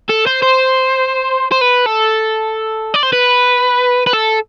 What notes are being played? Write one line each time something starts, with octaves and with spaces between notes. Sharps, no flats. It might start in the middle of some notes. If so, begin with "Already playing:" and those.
A4
C5
C5
C5
B4
A4
D5
C5
B4
B4
A4